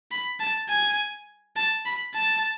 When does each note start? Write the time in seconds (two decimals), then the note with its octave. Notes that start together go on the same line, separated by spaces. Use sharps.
0.11 B5
0.40 A5
0.69 G#5
1.56 A5
1.86 B5
2.15 A5